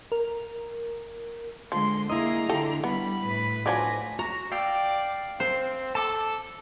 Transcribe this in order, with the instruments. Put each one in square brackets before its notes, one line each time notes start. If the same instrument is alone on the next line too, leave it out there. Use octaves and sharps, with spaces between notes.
[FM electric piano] A#4
[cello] D3 G#3 [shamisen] F3 [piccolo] C6
[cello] A#3 G#4 [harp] E4 D#5 [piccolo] A#5
[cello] D3 D4 [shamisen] F4 G4 A4
[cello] G3 [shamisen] B3 [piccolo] B5
[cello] A2 B4
[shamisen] D3 F3 F#3 [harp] D5 G#5 [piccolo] A#6
[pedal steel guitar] F#4 [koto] A#5
[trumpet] D5 [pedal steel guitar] F5 G5 E6
[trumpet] C4 [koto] C5
[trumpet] A4 [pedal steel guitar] A5 D6